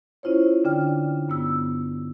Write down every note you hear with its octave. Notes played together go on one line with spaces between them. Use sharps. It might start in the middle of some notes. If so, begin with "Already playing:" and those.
C#4 E4 F4 C5 C#5
D3 D4 D5 G5 F6
G2 B3 E6